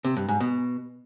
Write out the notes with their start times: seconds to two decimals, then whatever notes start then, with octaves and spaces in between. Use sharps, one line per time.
0.05 C3
0.17 G2
0.28 G#2
0.40 B2